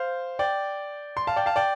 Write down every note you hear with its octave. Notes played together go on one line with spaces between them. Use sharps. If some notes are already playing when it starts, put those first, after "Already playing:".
Already playing: C5 F5
D5 G5
C6
F5 A5
D5 G5
F5 A5
D5 G5